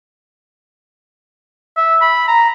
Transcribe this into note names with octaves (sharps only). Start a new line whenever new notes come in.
E5
B5
A#5